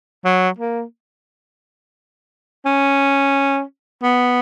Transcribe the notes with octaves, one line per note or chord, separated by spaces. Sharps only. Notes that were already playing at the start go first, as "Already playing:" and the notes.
F#3
A#3
C#4
B3